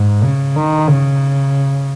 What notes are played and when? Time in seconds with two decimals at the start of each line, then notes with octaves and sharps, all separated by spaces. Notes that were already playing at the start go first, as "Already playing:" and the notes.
Already playing: G#2
0.23 C#3
0.56 D#3
0.87 C#3